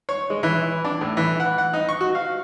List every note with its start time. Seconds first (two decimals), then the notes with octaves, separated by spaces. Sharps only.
0.09 C#5
0.30 G#3
0.43 E3
0.85 D4
1.01 A2
1.17 E3
1.40 F#5
1.58 F#5
1.74 D#4
1.89 C#6
2.01 F#4
2.15 F5